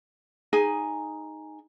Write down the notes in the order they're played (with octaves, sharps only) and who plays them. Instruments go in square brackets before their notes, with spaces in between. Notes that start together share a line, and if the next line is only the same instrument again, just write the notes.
[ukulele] D#4 G#4 G#5